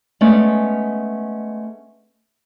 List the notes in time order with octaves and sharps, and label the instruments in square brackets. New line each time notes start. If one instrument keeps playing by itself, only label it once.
[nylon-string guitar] G#3 A3 B3 C#4 D5